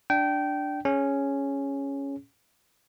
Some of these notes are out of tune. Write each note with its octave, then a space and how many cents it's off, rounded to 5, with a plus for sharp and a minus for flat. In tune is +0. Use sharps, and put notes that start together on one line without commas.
D4 +0 G5 -20
C#4 +0 G#4 +0